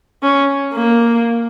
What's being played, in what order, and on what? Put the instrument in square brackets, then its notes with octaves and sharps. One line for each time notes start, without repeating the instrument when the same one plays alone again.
[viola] C#4
A#3